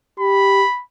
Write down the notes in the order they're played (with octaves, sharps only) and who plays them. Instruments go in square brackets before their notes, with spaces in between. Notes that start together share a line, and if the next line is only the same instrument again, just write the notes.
[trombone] G4 [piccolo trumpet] B5